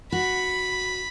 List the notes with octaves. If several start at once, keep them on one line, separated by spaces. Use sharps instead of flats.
F#4 B5